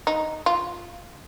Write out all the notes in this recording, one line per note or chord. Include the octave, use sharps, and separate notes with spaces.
D#4
F4